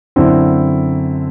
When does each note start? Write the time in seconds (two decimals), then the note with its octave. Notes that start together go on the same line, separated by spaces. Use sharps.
0.16 F#2 D3 C4 E4